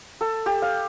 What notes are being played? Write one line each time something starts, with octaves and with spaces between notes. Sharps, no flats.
A4
G4
F5